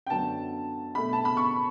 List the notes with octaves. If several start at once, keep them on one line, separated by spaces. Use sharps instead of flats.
G5
F#2 D3 F#3 B3 A5
B2 A3 B5
A5
B5
C#6